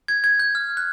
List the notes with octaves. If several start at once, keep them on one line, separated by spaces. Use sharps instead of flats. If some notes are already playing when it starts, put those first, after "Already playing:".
G#6
G#6
G6
F6
F#6